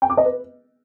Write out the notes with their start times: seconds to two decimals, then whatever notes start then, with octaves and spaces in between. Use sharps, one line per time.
0.02 G5
0.10 D6
0.17 D#5
0.25 B4